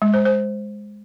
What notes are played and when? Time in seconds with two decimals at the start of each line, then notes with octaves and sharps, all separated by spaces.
0.02 G#3
0.14 C5
0.26 C5